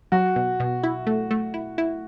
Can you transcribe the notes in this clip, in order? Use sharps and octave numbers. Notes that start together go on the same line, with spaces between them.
F#3 F#4
B2
B2
E4
A3
A3
E4
E4